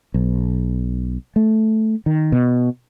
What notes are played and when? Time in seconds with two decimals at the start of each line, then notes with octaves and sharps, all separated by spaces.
0.14 B1
1.36 A3
2.06 D#3
2.32 B2